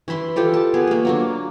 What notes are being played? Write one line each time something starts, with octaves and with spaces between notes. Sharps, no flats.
E3 E4 B5 C6
F4 G4 A4 D5
A5
B3 G#4 B4
A3 A#3
F#3 A#3 D4